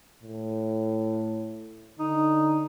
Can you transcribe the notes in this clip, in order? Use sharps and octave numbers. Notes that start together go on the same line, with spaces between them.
A2
D3 D#4